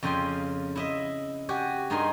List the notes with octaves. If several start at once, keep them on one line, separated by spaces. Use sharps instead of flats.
F2 C#3 F4 G5 G#5 C6
E4 D#5 E5
F#4 G4 G#5
G2 D#4 G#4 A#4 G#5 C6